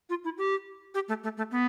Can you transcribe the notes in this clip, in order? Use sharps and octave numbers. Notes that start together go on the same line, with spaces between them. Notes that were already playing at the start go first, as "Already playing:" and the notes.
F4
E4
G4
G4
A3
A3
A3
B3